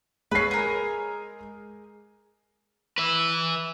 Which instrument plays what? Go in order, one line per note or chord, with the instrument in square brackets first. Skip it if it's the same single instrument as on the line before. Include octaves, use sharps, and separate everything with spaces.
[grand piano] G#3 C7 [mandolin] C#4 B4
[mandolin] G#4 A#4
[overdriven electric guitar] B4 E5